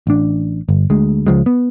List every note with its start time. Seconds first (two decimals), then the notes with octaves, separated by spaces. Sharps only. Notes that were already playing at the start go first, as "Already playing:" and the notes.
0.07 A1 D4
0.69 G1
0.90 D2 G#3
1.27 C#2 F3 G#3
1.46 B3